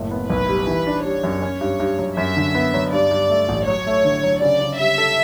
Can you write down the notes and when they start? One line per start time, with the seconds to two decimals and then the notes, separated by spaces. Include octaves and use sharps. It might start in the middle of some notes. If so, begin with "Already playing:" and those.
Already playing: F#1 A2
0.11 B3
0.29 B1 B4
0.49 G3
0.67 E3
0.87 D4
1.04 G3 C#5
1.23 F#2
1.42 C#4
1.61 G2
1.80 G2
1.99 F#3
2.17 F#2 E5
2.37 D3
2.55 B3
2.74 F#3
2.92 G2 D5
3.11 G2
3.30 A3
3.49 A1
3.67 F#3 C#5
3.87 A3
4.05 D3
4.23 F#3
4.42 C#3 D5
4.61 C#3
4.79 G3 E5
4.98 A4